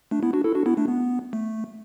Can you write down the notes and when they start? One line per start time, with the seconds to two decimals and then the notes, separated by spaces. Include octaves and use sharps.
0.11 A3 D4
0.23 B3 E4
0.33 D4 F#4
0.44 E4 A4
0.55 D4 F#4
0.66 B3 E4
0.77 A3 D4
0.88 B3
1.33 A3